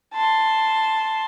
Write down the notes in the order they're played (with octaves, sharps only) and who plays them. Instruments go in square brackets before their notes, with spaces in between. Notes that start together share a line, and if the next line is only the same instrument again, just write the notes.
[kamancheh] A5 C6